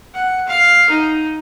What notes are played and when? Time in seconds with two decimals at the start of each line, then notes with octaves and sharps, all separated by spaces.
0.14 F#5
0.47 F5
0.90 D#4